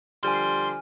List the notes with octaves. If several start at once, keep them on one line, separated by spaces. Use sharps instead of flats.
D3 F3 G3 G#5 C6 F6